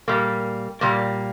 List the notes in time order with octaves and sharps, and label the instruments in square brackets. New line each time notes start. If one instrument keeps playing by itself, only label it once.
[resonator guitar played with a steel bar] A#2 G3 A#3
A#2 G3 A#3